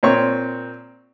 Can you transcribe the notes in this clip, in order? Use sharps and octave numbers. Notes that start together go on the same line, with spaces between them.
A#2 C4 C#5 C#6